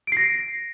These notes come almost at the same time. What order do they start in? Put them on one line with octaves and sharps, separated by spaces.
D7 C7 A#6